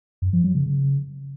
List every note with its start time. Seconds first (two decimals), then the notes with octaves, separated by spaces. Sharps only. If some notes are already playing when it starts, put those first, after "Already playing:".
0.22 F#2
0.33 F3
0.44 F#3
0.55 C#3
0.66 C#3